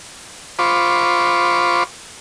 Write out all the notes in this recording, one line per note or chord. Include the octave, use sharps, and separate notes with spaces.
F4 C5 B5 C#6 D6